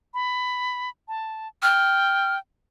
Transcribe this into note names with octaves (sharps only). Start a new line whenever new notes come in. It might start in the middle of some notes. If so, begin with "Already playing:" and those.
B5
A5
G5 F6